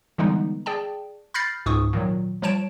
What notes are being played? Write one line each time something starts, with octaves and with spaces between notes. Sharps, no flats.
D3 E3 G3 G#3 B3 D#4
G#4 D5 G5 A5
B5 F6 G6 A6 A#6 C7
C#2 G#2 C#6 D#6
A#2 D#3 F#3
F3 G3 C#5 A5 D7 E7